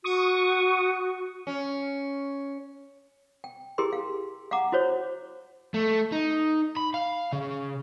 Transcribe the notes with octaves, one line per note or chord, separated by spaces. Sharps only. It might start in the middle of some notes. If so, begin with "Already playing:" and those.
F#4 C#6 D#6
C#4
G5
E4 G4 G#4 A#4 C6
F5
F5 F#5 A#5 D6
E4 F#4 C5 C#5
A3
D#4
B5
F5
C#3